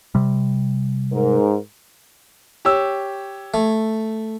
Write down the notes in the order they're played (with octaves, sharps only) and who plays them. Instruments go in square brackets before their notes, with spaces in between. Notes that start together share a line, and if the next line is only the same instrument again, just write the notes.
[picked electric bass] C3 G3
[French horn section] G#2 A#4
[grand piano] G4 C#5 E6
[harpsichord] A3